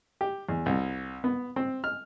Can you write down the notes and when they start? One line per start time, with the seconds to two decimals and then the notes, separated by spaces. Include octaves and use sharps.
0.21 G4
0.49 E2
0.66 C2
1.24 B3
1.56 C4
1.84 F6